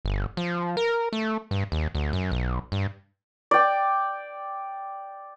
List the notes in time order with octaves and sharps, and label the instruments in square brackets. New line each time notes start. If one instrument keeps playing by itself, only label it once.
[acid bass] G1
F3
A#4
A3
G2
D#2
D2
F#2
B1
G2
[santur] D5 G5